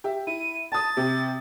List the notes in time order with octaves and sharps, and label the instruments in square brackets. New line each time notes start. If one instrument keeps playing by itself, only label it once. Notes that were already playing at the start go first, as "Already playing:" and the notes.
[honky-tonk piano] G4 E5
[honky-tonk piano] E4 [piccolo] D#7
[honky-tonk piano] A5 D#6 [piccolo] A6
[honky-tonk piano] C3